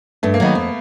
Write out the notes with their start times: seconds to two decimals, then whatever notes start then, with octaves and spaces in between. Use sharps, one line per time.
0.23 G2 A3
0.34 A#3
0.40 D#3 F#3 B3
0.55 F2